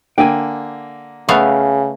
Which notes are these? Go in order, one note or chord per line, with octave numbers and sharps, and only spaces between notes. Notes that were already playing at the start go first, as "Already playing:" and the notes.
D3 A#3 G5 G#5
C#3 A3 B3 F5